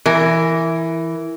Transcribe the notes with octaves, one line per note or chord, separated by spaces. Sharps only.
E3 A#4